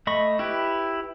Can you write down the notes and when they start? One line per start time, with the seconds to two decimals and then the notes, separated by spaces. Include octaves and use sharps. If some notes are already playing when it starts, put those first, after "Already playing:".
0.07 A3 D#5 B5 C#6
0.39 E4 G4 B4